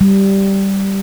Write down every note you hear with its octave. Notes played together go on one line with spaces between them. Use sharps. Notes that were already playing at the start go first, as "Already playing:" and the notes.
G3